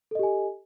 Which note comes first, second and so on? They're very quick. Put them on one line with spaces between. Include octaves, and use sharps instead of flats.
A4 D#5 G4 G#5